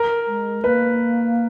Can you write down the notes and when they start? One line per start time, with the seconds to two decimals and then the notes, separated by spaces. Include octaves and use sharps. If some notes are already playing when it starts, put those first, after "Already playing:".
Already playing: A#4
0.27 G#3
0.64 A#3 B4